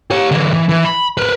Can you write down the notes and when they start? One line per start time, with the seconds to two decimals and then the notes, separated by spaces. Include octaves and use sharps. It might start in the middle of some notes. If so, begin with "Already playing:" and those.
0.10 G4 C#5
0.31 D3 E3
0.53 E3
0.69 E3
0.85 B5
1.17 A#4 B4